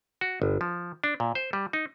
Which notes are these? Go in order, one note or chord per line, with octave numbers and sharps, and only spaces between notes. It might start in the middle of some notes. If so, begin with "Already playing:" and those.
F#4
G1
F3
D4
A#2
C5
G3
D#4